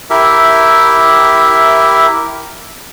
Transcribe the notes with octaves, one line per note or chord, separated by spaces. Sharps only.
E4 G4 A#4 E5